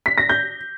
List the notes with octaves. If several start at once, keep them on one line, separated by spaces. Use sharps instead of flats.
B6
A#6
G6